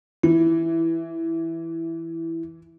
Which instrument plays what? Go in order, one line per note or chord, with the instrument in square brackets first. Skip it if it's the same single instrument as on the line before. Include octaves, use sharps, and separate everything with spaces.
[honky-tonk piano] E3 [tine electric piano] E4